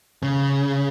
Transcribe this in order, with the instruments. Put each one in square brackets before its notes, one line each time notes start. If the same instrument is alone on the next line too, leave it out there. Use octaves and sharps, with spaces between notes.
[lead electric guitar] C#3